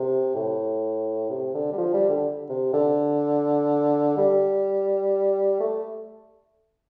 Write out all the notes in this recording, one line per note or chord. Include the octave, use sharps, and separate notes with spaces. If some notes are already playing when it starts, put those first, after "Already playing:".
Already playing: C3
A2
C3
D3
G3
F3
G3
D3
C3
D3
G3
A3